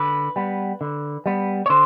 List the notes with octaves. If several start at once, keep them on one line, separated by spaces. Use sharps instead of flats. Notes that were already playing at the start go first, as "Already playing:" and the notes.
Already playing: D3 B4
G3 B3
D3
G3 B3
C#5
D3 C5